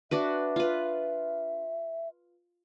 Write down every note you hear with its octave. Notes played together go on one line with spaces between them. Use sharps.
D4 F#4 B4 E5
F4 B4